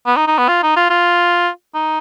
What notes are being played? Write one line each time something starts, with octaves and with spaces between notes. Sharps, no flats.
B3
D#4
D#4
B3
F4
D#4
F4
F4
D#4